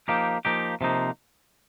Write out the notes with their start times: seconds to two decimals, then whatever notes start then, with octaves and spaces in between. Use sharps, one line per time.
0.08 F3 A#3 D#4 G4
0.45 F3 A#3 D#4 G4
0.81 C3 F3 A#3 D#4